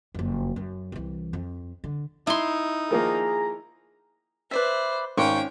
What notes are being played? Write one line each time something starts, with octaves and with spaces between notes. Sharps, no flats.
F#1 F2
F#2
C2 E3
F2
D3
D#4 E4 C6
D#3 F3 A#3 G#4 A#5
B4 C5 D5 E5
G#1 C#4 G5 C#6